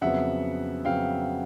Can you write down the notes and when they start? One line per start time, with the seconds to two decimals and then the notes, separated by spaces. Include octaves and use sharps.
0.01 F2 C#3 F#3 B3 E5 F#5
0.84 F2 C#3 F#3 B3 F5 G5